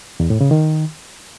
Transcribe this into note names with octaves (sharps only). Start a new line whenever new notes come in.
E2
A2
C#3
D#3